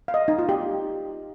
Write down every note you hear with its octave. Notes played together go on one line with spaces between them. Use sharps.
F5
D#5
D#4
F4
G4